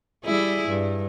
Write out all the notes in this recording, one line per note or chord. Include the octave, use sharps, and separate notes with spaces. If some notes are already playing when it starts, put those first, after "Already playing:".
G3 E4 G#4
G2